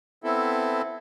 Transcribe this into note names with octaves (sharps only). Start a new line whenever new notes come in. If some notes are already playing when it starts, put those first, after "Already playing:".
B3 C4 E4 A4